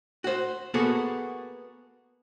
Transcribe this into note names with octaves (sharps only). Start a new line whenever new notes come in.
F#4 C5
A#3 B3 F#4 G#4 A4